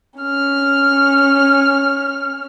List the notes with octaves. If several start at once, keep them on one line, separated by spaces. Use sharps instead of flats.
C#4 F6